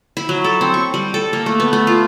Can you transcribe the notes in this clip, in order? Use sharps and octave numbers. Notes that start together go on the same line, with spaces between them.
E4
F#3
A4
C4
C#6
G3
A4
A#3
A3
B3
A3
F4